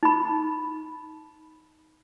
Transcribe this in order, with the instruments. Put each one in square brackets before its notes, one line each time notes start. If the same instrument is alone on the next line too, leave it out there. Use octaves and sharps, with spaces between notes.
[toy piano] D#4 B5